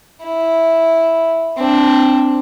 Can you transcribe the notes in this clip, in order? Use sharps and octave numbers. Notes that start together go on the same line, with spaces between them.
E4
C4 D4